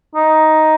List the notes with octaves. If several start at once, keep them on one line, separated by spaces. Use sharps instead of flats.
D#4